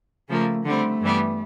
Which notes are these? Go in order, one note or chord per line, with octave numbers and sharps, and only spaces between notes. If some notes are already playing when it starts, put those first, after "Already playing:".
C#3 F3 A3 A#3
D3 G3 A3 C4
G2 E3 G3 B3